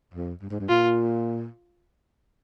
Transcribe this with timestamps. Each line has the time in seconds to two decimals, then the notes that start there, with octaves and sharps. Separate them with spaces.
0.14 F2
0.42 G2
0.50 G#2
0.60 G2
0.69 A#2 F4